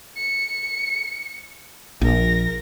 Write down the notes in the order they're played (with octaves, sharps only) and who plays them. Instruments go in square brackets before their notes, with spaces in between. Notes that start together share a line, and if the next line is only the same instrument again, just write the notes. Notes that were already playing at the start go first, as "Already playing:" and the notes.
[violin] C#7
[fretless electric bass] A#1 [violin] A#4 A#6